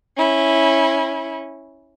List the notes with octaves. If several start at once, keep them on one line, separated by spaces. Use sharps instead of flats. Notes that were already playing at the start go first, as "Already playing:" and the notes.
C#4 E4